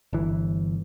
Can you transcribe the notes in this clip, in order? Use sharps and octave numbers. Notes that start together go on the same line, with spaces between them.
G1 E3